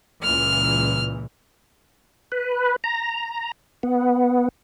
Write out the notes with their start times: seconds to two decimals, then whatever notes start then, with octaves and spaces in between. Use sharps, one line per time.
0.22 C#2 A#2 E3 F6
2.32 B4
2.84 A#5
3.83 B3